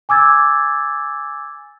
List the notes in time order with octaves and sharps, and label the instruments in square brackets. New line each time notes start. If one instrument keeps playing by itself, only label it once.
[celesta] G#5 D6 E6 G#6 A6